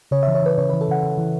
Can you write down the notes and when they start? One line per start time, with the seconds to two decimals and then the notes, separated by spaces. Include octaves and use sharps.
0.11 C#3 C#5
0.23 E3 E5
0.35 C#5
0.43 E3 B4
0.58 C#3 C#5
0.69 E3 B4
0.81 A4
0.89 C#3 F#5
1.03 C#3
1.18 E3